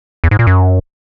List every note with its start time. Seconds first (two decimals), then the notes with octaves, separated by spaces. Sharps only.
0.24 E2
0.31 G#2
0.39 A#2
0.47 F#2